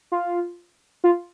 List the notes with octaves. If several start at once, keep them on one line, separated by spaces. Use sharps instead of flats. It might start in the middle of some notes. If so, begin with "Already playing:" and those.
F4
F4